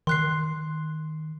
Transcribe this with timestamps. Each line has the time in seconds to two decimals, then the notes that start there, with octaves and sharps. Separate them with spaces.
0.07 D#3 C6 F#6 C7